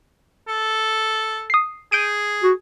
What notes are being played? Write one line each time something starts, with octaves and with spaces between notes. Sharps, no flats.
A4
D#6 C7
G#4 G6 D7 D#7
F#4